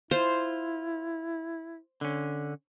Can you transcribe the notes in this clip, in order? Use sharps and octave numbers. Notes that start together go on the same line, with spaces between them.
E4 F4 C5
D3 C#4